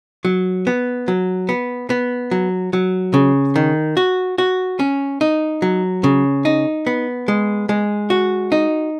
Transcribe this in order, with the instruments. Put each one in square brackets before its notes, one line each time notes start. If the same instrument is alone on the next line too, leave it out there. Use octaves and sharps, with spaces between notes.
[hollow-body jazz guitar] F#3
B3
F#3
B3
B3
F#3
F#3
C#3
D#3
F#4
F#4
C#4
D#4
F#3
C#3
D#4
B3
G#3
G#3
F#4
D#4